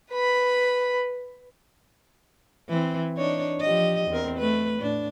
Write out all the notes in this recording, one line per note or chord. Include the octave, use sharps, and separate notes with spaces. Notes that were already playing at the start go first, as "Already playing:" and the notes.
B4 B5
E3 C4
D4 D#4 C#5
F3 G4 D#5
E2 C4 A#4
A3 B4
A2 D4